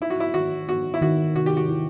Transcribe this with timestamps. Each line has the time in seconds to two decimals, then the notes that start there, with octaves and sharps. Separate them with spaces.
0.01 D#4 E4
0.10 F#4
0.20 E4
0.34 D#3 F#4
0.68 B3 F#4
0.94 E4
1.01 D#3 F#4
1.35 C3 F#4
1.46 G4
1.57 F#4
1.69 E4